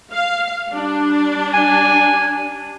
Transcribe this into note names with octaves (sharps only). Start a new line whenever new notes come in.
F5
G3 D4
G#5